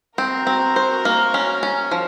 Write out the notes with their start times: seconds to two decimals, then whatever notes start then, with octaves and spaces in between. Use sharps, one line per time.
0.17 C4 F#4 A#4
0.47 C4
0.76 C5
1.05 A#3
1.34 C#4
1.63 C#4
1.91 F3